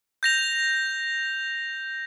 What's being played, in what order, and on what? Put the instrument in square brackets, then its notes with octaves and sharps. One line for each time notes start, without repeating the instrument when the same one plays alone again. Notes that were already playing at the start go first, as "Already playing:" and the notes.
[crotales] G6 A#6 F7